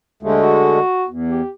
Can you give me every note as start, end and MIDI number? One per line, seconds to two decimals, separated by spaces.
0.23 0.39 39
0.23 0.79 50
0.23 0.79 56
0.23 0.79 57
0.42 1.07 66
1.08 1.41 40
1.29 1.51 67